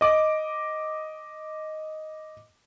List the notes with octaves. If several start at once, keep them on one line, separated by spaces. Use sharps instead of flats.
D#5 D6